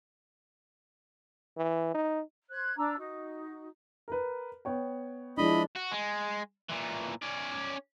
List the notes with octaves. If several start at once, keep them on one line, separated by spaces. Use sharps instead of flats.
E3
D#4
C5 F#6 G#6
D4 A#5 D6 E6
D#4 F#4
A#4 B4
B3 C#5 G5
F3 G#3 D4 E4 D#5 B5
F#4
G#3
A#2 E3
C#4 D5